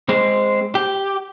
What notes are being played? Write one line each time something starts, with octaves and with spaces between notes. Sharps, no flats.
G#3 C4
G4